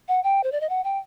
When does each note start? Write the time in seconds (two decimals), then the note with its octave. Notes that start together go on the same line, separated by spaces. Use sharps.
0.08 F#5
0.24 G5
0.44 C5
0.52 D5
0.61 D#5
0.69 F#5
0.84 G5